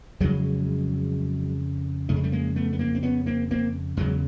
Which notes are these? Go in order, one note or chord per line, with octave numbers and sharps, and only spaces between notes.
F2 C#3 F#3 G#3
F2 C#3 A3
G#3
G3 A3
G#3 A#3
A3 B3
B3
A#3 C4
C4
B3 C#4
A#3 C4
A#3 C4
E2 C#3 F#3 G#3